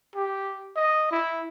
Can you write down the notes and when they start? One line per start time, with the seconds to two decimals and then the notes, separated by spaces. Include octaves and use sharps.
0.16 G4
0.76 D#5
1.12 E4